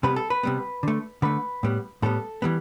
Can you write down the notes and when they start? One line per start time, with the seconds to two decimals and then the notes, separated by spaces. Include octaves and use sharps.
0.03 C3 G3 B3 B4
0.16 A4
0.30 B4
0.43 C3 G3 B3
0.83 D3 A3
1.22 D3 A3 B4
1.63 A2 G3 B3
2.02 A2 G3 B3 A4
2.42 E3 G3 B3